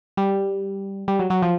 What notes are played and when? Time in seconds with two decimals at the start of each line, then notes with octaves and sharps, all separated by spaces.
0.17 G3
1.08 G3
1.19 F#3
1.30 F#3
1.42 F3